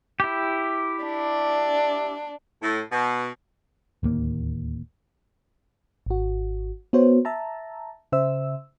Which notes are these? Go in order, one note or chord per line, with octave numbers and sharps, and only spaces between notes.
E4 G4
D4
A2
B2
D1 D#2 A#3
G#1 F#4
B3 F#4 C5 C#5
E5 A5 A#5
C#3 C5 E5 E6